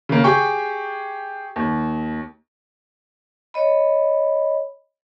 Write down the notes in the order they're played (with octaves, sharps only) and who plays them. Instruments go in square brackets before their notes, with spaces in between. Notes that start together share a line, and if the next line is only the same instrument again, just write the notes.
[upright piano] C#3 A#3
G4 G#4 G5 C#6
D#2
[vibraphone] C#5 D#5 B5